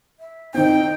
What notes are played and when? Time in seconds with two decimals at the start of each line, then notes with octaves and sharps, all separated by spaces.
0.20 E5
0.54 D#3 C4 D#4 G5